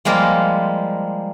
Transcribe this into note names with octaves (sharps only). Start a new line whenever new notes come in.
F3 G3 G#3 A#3 A#4 C5